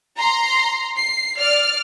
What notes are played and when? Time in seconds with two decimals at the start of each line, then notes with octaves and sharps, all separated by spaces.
0.17 A#5 C6
0.97 C7
1.38 D5 F6